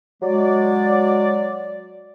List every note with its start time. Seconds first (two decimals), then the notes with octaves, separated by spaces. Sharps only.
0.22 F#3 G#3 D5